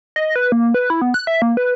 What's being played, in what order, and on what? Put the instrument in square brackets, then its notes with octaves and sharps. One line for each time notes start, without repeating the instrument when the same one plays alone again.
[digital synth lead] D#5
B4
A#3
B4
E4
B3
F#6
E5
A#3
B4